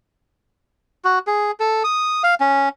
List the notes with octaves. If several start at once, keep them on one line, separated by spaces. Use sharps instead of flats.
F#4
G#4
A4
D#6
F5
C#4